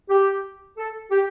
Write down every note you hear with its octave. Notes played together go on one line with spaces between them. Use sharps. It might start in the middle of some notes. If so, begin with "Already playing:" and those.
G4
A4
G4